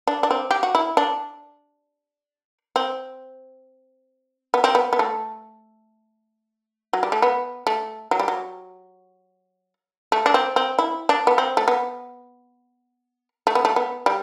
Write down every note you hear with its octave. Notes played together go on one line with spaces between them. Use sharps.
D4
D4
C4
G4
F#4
E4
D4
C4
B3
C4
B3
B3
A3
F#3
G3
A3
B3
A3
F#3
G3
F#3
A3
D4
C4
C4
E4
D4
B3
C4
A3
B3
A3
B3
A3
B3
G3